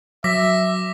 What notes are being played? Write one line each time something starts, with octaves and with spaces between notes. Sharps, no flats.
F#3 E5 D6 A#6 B6